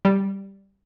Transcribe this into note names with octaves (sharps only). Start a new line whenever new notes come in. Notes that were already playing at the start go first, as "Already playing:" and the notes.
G3